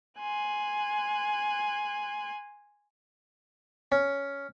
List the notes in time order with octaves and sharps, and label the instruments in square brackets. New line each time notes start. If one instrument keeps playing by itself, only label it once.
[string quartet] G#5 C6 F#6
[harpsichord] C#4